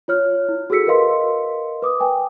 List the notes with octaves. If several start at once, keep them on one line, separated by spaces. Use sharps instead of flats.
F4 C#5 F6
E4
F#4 G#4 A4 E6 B6 C#7
A#4 B4 D#5 F5 C6
B4 D6 D#6
B4 G5 G#5